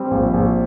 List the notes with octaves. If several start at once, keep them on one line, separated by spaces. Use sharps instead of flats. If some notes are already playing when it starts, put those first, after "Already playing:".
Already playing: G3 C4
A#1
A#1